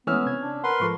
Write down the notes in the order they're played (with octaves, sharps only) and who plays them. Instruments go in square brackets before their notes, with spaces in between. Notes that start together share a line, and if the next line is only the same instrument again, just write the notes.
[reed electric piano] E3 G#3 A3 [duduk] B3 [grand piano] C#4 E6 F6
[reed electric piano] C3 C4 G#6
[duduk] D4
[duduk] A#4 [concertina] B4 C6 [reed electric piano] F#5
[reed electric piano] G#2 F3 A4 [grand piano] A#5 C#6